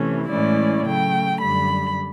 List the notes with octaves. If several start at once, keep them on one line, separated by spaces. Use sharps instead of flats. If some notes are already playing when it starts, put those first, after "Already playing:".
Already playing: C3 E3 A3 C#4
A2 E3 G#3 C#4 E4 D5
C#3 F#3 A3 G5
F#2 D3 G3 B5